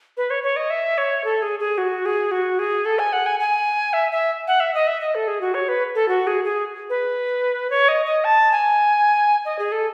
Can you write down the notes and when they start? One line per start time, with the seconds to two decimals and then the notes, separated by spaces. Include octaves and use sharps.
0.17 B4
0.30 C#5
0.43 C#5
0.56 D#5
0.70 E5
0.98 C#5
1.24 A4
1.42 G#4
1.60 G#4
1.78 F#4
2.06 G#4
2.31 F#4
2.59 G#4
2.85 A4
2.99 G#5
3.13 F#5
3.26 G#5
3.40 G#5
3.93 E5
4.12 E5
4.47 F#5
4.60 E5
4.74 D#5
4.87 E5
5.00 D#5
5.15 A4
5.28 G#4
5.41 F#4
5.54 C#5
5.69 B4
5.95 A4
6.08 F#4
6.27 G#4
6.44 G#4
6.90 B4
7.70 C#5
7.88 D#5
8.06 D#5
8.24 A5
8.52 G#5
9.45 D#5
9.59 G#4
9.72 A4